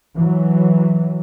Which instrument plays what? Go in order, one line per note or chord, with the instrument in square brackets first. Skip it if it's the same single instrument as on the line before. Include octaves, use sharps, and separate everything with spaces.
[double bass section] E3 F#3